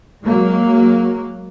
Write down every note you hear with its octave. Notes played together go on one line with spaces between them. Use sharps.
F#3 G#3 A#3